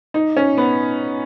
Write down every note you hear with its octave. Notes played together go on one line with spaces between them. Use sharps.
D#4
C#4
B3